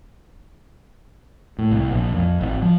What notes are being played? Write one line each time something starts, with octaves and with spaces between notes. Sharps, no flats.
A2
C2
A#1
F2
G#1
F3